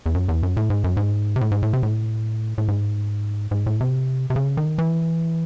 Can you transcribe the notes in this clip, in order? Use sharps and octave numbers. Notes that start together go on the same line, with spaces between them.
E2
F#2
E2
F#2
A2
G#2
F#2
G#2
C3
A2
G#2
A2
C3
A2
A2
G#2
G#2
A2
C3
C3
C#3
D#3
E3